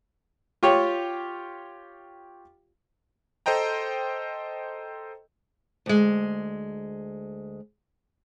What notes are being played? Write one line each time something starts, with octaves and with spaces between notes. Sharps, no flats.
F4 G4 C#5
A4 C5 D#5 G5 A#5
D2 G#3